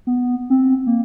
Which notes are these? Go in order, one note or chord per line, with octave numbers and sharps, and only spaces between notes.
B3
C4
A#3